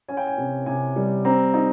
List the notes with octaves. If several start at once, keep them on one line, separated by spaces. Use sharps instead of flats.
C#4 G#5
G5
G#5
C3
C3 G#5
G3
C4 A#5
D#4